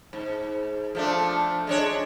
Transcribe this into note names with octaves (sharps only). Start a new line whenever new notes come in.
G#2
F3 A3 D4
G#3 D4 C#5